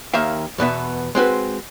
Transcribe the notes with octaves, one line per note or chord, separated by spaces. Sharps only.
D#2 D#3 A#3 E5 F5
E2 B2 B3 E5
G#3 C4 F#4 B4